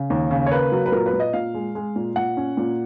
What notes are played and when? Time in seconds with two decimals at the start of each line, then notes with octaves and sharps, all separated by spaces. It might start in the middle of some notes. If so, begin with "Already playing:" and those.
Already playing: C#3
0.10 D#2
0.31 C#3
0.46 C#5
0.51 A#3 B4
0.72 F#3
0.86 B4
0.92 A#2 A#4
1.06 B4
1.13 A#2
1.20 D#5
1.33 A#2 F5
1.54 G#3
1.75 G#3
1.96 A#2
2.16 A#2 F#5
2.37 C#4
2.57 A#2